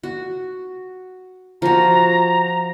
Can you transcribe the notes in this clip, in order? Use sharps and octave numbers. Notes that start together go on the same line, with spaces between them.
F#4
F3 F#4 A#5